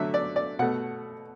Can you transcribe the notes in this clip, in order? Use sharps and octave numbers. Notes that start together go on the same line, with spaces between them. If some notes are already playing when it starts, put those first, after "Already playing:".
Already playing: D3 F#3 A3 E5
D5
D5
B2 A3 F#5